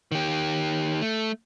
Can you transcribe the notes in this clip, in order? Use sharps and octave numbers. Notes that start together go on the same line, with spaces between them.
D#3 G4
A3